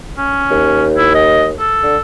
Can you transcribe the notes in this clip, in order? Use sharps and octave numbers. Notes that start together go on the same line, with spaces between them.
C#4
D#2
E4
D#5
A4
D3